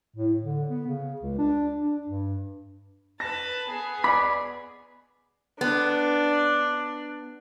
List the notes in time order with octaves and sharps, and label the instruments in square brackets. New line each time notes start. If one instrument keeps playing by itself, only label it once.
[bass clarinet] A2
D3
B3
C#3
C#2
D4
D4
G2
[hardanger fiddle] B4 A5 [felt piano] A#6
[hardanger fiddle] B3 G#4
[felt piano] D5 D6 [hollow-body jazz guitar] B5
[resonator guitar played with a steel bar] B3 [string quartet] D4